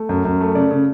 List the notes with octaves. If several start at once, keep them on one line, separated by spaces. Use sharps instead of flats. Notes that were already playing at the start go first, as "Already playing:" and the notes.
Already playing: A3
F#2
F#2
A3
C#3 D5
C#3